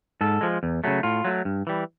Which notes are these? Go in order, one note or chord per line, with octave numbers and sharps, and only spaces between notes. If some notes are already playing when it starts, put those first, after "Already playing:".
G#2 A4
F3 G#3
E2
C#3 F#3 A3
A2 F4
F#3 A3
G2
E3 G3